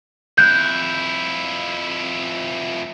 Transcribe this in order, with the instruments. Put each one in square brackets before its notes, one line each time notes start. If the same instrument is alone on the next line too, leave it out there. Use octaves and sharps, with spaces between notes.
[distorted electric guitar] F2 E4 [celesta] F#6 G6